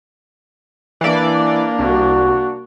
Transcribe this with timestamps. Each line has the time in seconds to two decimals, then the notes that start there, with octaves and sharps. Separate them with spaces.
1.01 E3 A#3 D4 D5
1.79 C2 F#4